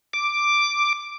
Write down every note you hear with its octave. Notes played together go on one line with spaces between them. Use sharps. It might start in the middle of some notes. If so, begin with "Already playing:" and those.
D6